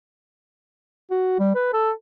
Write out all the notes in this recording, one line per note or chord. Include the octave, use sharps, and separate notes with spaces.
F#4
G3
B4
A4